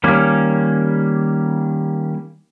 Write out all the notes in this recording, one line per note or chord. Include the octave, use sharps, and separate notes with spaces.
D#3 G3 A#3 C#4